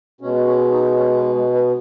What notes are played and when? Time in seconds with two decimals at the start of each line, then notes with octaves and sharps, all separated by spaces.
0.21 B2 C#4
0.25 G#3
0.47 C#4
0.72 D#4
0.97 C#4
1.16 B3
1.35 G#3
1.53 B3